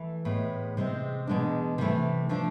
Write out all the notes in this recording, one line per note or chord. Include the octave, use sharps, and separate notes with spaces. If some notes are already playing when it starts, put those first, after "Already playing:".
Already playing: E3 A3
A2 G#3 B3
C3 G#3 C4
E2 B2 G#3 D4
C3 E3 A3
F3 A3 D4